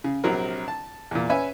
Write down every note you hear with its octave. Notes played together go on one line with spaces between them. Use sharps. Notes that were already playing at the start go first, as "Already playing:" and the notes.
C#3
A#1 C3 F#3 C4 A#4
A5
E2 A#2
C#4 B4 E5 G#5